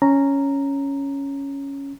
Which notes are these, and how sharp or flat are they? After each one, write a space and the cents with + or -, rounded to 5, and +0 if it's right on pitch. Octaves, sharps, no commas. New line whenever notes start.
C#4 +0 A#5 -5